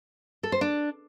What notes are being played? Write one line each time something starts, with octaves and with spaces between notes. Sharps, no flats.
A4
C5
D4